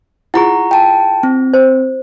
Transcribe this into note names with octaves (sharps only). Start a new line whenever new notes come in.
E4 F4 G#4 F#5 A#5 C#6
G5 A5
C4
C5